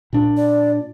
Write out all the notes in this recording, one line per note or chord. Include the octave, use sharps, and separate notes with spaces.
A#2 D4
D5